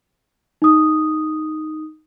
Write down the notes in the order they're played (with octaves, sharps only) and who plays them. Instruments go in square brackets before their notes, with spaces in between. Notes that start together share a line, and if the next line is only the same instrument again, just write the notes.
[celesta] D#4 D#6